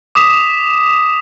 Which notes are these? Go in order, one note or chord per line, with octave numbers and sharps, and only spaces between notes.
D6 D#6 B6 E7